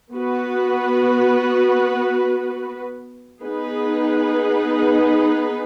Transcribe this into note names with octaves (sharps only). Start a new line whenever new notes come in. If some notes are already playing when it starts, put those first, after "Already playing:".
B3 F#4 B4
B3 D#4 G#4 B4